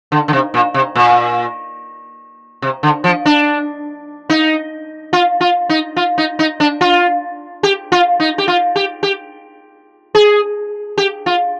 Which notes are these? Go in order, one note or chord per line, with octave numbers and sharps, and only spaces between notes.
D3
D3
C3
A#2
C3
A#2
C3
D3
F3
D4
D#4
F4
F4
D#4
F4
D#4
D#4
D4
F4
G4
F4
D#4
G4
F4
G4
G4
G#4
G4
F4